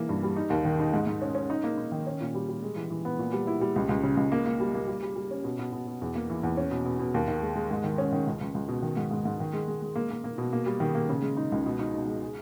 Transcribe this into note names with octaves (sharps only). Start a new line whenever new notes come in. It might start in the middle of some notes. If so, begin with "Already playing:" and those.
Already playing: E3 A#3
G2
G3
D#4
D#2
D#3
D#4
G#2
G#2
C#4
C#4
D#4
A#3
D#4
D#3
C#4
A#2
G3
G3
G#3
E3
E3
B3
A#2
G3
E4
G3
C#2
C#2
C#3
C#2
A#3
A#3
G3
A#3
G3
G3
G3
C#4
B2
B2
B2
B2
E2
A#3
E3
E2
C#4
B2
B2
B2
D#2
D#3
G#3
G#3
G#2
D#3
C#4
D#3
C#2
C#2
C#2
B2
D#3
G#2
G#2
G#2
D#3
G#3
G#3
G#3
A#3
A#3
A#3
B2
A#3
G3
D#3
A#3
C#3
G#3
D#4
C#2
B2
D#4
B2
G#3
G#4